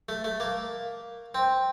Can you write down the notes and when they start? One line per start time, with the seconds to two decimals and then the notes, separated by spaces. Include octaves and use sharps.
0.09 A3
0.24 A3
0.40 A#3
1.35 C4